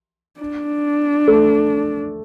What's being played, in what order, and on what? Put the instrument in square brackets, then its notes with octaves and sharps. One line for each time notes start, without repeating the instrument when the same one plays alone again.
[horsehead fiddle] D4
[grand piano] A3